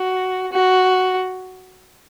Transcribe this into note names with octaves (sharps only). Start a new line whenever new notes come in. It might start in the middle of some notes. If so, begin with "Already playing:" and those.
Already playing: F#4
F#4